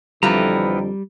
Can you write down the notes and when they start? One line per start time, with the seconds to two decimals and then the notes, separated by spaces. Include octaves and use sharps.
0.23 F2 D3 E3 F3 G3 B3 G5 A#5